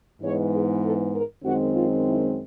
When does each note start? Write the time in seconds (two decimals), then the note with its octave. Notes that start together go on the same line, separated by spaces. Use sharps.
0.21 G#2 E3 G#3 B3 C#5
0.51 G#4
0.82 A4
1.13 A#4
1.44 F#2 D#3 G#3 C4 F#4
1.74 F4
2.05 E4